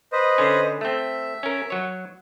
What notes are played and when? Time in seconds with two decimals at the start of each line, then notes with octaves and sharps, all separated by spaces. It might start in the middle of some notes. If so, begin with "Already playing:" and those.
0.12 B4 C5 D#5
0.38 D3 C#4
0.81 A3 C4 E5
1.43 C#4 A#4
1.70 F#3 C#5